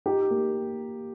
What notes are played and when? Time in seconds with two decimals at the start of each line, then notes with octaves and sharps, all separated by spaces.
0.06 D#4 G4
0.31 A#3